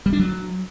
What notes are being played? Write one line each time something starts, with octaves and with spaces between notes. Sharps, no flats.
G3
D4
F#3